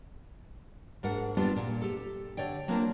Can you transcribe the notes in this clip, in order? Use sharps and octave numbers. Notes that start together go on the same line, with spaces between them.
G#2 D4 A#4 F#5
G3 B3 C4 D4 F4 G4
A#2
G4 A4
D3 C#5 D5 G5
F#3 A#3 C4 D4 F4 A#4